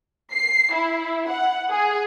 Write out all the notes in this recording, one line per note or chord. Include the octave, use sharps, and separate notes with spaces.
C7
E4
F#5
G#4